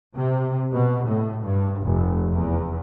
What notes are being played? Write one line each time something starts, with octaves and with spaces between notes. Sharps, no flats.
C3
B2
A2
G2
F1
E2